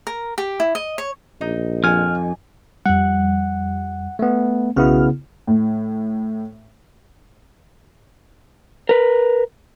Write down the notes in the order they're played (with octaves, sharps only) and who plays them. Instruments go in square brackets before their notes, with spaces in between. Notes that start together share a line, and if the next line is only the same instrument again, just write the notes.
[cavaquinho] A#4
G4
E4
D#5
C#5
[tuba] A#1 [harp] D#4
[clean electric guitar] F2 [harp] G#5 [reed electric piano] F6
[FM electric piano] F2 G3 [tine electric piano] F#5
[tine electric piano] A3 B3
[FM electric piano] B1 F#4 F6 [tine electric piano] C#3 B3 E4
[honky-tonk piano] A2
[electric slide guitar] A#4 B4